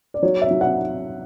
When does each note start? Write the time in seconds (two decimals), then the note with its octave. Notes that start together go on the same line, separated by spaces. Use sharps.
0.14 D5
0.23 F#3 C#5
0.42 E5
0.51 F#3
0.61 F#5